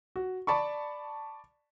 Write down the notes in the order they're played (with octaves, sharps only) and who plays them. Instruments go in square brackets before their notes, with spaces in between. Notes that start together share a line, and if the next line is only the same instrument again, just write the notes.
[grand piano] F#4
D5 A5 B5 C#6